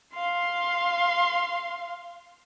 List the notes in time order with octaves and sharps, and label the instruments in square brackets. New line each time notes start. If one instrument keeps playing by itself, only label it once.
[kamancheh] F5 C6